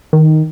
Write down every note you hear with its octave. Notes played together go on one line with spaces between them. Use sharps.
D#3